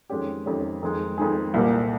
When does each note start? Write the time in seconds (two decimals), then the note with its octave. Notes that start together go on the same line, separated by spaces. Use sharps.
0.10 F2 D#3 G#3 C#4 G4
0.46 F2 D#3 G#3 C#4 G4
0.83 F2 D#3 G#3 D#4 G#4
1.18 F2 D#3 G#3 D#4 G#4
1.54 C2 A#2 G3 A#3